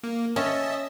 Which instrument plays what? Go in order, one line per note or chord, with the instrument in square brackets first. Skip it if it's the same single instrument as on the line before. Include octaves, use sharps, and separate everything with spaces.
[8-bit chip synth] A#3
[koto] C#4 [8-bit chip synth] D#5 E5 A5